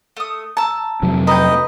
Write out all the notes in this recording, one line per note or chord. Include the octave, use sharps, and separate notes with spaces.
A3 D#6
A5 A#5 E6
F2 C3 F#3
B4 D#5 G5 A#5 G6